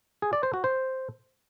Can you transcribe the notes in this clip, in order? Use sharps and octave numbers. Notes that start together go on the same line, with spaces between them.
G#4
D5
C5
F#4
C5